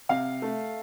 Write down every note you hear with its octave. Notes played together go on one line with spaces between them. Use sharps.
C3 F5
A3